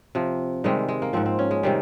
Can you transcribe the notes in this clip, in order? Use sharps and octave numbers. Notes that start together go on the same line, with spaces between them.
C3 F3
C3 D#3 G3 G#3
G#3
A#3
G#2 F3 C4
C4
C#4
G#3
C3 D#3 G3